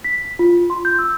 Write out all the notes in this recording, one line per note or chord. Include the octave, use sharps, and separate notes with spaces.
B6
F4
C6
G6
E6